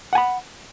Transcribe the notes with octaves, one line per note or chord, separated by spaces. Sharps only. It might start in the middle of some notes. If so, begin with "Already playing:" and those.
F#5 G#5 B5